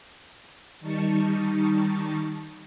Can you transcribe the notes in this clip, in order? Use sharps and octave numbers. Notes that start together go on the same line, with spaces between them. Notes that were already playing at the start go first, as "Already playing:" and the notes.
D#3 G3 D#4 A5 C#6